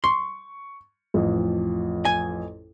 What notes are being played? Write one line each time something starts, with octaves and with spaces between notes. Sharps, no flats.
C6 C#6
A1 F2
G#5